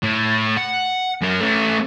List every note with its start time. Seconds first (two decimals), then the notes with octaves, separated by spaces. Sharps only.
0.03 A2
0.58 F#5
1.21 F#2 A#4
1.40 A3 C#4